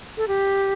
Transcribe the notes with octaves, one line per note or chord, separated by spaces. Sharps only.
A4
G4